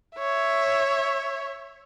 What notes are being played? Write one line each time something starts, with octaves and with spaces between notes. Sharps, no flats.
C#5 E5